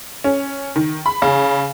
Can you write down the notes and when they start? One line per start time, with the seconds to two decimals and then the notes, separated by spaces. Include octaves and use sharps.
0.24 C#4
0.76 D#3
1.06 B5
1.22 C#3